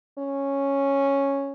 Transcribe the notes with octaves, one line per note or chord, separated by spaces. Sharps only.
C#4